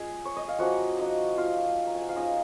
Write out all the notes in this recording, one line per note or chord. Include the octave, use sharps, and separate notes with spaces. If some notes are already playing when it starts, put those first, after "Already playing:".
Already playing: G#3 C#4 F4 G#4 G#5
C#5
D#5
F5
F3 A#3 C#4 F#4 F#5
D#4 D#5
F4 F5
A#5
G#5
F#5
F5
G#3 C#4 D#4 F4 D#5